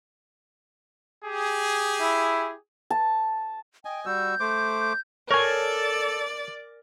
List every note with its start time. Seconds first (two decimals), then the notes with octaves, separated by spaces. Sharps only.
1.25 G4 G#4
2.00 E4
2.90 A5
3.85 D#5 G5 G#5
4.06 G3 F#4 E6 G6
4.40 A3 C5 D6
4.80 G6
5.31 A4 A#4 C#5 D5 G#5